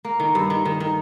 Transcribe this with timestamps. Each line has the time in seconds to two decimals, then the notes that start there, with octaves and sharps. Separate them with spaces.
0.05 A#3
0.20 D#3
0.35 G2
0.50 D#3
0.65 D#3
0.80 D#3